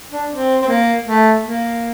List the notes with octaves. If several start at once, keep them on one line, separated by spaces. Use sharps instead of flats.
D4
C4
C4
A#3
A3
A#3